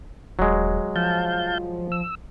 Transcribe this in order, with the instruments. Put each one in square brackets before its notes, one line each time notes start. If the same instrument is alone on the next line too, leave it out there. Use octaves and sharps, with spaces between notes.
[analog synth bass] D#1 [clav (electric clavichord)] F#3 G#3
[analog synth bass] F3 [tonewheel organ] F5 A5 G6
[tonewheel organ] E6